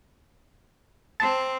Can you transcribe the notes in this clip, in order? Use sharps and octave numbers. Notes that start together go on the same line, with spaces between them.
C4 A5